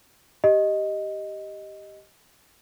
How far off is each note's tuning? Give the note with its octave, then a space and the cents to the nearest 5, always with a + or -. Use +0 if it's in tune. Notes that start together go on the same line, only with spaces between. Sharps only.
G4 -5 D#5 +0